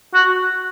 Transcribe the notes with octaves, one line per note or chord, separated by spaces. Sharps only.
F#4